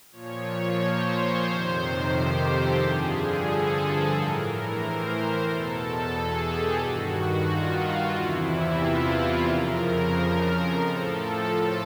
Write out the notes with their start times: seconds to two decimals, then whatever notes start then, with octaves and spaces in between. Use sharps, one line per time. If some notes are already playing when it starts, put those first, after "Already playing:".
0.11 A#2 F3 C#5
0.77 C5
1.45 F2 C3 D#3
2.12 G4
2.45 A4
2.77 G2 D3 F3 G#4
3.45 A4
4.12 A2 E3 A#4
4.45 A#4
4.78 C5
5.44 E2 B2 A4
6.11 G#4
6.45 G4
6.77 G2 D#3 F#4
7.45 F4
8.11 E2 C3 E3 E4
8.78 F4
9.44 F2 C#3 F3 A#4
10.11 A#4
10.78 A2 F3 A4
11.44 F4